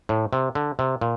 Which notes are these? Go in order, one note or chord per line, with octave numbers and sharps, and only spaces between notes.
A2
C3
D3
C3
A#2